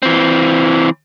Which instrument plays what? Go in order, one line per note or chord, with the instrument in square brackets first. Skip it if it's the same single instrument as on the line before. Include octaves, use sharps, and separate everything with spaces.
[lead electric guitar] E3 C4